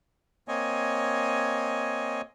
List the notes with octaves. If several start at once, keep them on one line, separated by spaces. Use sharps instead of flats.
A#3 C4 C#5 D#5 G#5